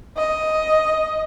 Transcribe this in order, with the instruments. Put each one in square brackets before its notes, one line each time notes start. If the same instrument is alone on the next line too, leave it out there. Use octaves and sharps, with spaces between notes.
[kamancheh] D#5